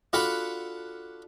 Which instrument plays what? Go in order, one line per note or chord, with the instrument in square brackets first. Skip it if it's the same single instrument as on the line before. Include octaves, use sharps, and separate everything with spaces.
[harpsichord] D4 F4 F#4 A4 F#5 B5